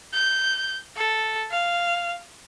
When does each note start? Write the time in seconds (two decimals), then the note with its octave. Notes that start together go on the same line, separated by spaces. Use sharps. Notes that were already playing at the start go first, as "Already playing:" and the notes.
0.14 G6
0.97 A4
1.51 F5